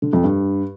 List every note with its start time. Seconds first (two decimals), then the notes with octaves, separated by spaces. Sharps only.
0.02 D3
0.13 F2
0.24 G2